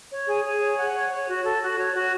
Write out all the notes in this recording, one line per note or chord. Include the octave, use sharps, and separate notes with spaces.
C#5
G#4
G#4
C#5
F#5
C#5
C#5
F#4
A4
F#4
C#5
F#4